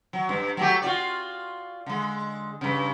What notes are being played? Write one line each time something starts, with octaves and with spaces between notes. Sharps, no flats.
F#3
G2
F#3 A3 G4
F4 F#4 D5
D3 G#3
G2 C#3